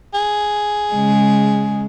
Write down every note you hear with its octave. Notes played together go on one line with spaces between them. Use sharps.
G#4
C#3 G#3